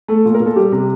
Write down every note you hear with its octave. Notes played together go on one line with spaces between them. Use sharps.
A3 A4
A#2
A#4
A#2
A4
G3 G4
C3